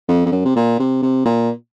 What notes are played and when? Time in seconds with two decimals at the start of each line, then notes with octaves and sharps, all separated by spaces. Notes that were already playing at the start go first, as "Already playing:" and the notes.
0.08 F2
0.26 F2
0.32 F#2
0.45 C3
0.56 A#2
0.79 C3
1.03 C3
1.25 A#2